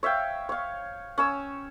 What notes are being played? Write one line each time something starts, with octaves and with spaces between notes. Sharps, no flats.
C#5 E5 F5 G5
C#5 F5
C#4 C#5 E6